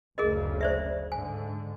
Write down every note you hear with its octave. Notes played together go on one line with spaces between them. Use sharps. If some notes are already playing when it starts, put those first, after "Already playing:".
F#1 D2 C#3 G#4 A#4 D#5
C5 D5 E5
G#2 D3 G#5